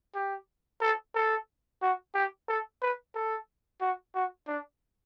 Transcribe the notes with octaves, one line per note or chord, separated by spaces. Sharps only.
G4
A4
A4
F#4
G4
A4
B4
A4
F#4
F#4
D4